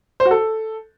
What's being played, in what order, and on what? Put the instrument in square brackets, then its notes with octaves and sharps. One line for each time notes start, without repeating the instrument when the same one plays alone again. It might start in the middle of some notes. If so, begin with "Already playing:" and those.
[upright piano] C5
F#4
A4